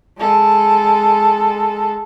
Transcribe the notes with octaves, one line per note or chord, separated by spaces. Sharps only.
G#3 A4